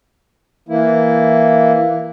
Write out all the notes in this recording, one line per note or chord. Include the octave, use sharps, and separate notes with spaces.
E3 A#3 E4